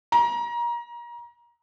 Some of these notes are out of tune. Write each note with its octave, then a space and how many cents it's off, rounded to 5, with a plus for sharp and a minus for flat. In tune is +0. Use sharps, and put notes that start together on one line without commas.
A#5 +25